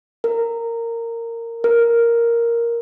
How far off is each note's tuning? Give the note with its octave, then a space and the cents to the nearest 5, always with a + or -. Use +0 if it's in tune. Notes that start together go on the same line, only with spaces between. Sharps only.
A#4 -15
A#4 +0